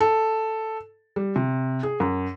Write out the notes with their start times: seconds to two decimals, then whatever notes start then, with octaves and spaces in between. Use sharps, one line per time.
0.01 A4
1.16 G3
1.36 C3
1.83 G#4
2.00 F#2